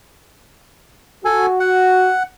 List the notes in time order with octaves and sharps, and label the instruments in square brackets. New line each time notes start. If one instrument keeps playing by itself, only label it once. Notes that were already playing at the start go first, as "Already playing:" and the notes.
[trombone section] F#4 [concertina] A4 G#5
[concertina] F#5